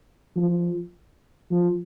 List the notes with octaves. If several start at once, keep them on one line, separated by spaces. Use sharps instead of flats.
F3
F3